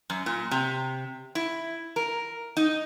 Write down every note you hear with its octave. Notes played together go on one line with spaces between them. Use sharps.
F#2
A#2
C3
E4
A#4
D#4